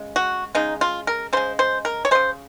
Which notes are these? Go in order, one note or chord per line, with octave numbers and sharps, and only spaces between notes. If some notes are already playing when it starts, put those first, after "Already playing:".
Already playing: C#3 G#3
F#4
C#3 G#3 D#4
F4
A#4
C#3 G#3 C5
C5
A#4
C#5
C#3 G#3 C5